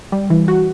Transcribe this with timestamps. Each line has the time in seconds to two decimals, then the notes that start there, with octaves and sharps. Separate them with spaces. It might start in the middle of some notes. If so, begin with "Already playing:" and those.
0.12 G3
0.30 E3
0.48 F#4